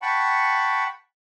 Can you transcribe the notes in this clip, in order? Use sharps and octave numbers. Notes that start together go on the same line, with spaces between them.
F#5 G5 A5 B5 C#6